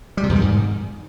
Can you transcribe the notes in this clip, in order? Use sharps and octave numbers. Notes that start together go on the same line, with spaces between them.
G3
C3
E2
D#3
G#2